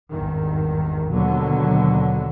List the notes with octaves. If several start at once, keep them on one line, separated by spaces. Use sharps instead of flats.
G#1 E2 G2 D#3
D#2 B2 D3 F#3